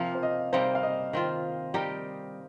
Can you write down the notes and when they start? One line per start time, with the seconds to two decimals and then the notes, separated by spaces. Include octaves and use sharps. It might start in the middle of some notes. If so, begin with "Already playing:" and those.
Already playing: C3 F3 A#3 F5
0.15 C5
0.23 D#5
0.53 C3 G3 A#3 D#4 C5
0.75 F5
0.83 D#5
1.13 D#3 C4 F4
1.74 G3 D#4 G4 A#4